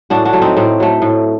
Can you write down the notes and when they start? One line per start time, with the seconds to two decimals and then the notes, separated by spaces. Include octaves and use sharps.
0.10 A2 D4 F#4
0.25 D4 F#4
0.33 F#3 A3
0.42 C4 D#4
0.57 A2 C4
0.80 F#3 A3
1.02 A2